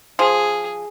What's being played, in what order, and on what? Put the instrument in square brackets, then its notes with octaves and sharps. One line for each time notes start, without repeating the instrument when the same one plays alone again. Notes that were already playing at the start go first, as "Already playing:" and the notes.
[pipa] F3 [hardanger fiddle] G#4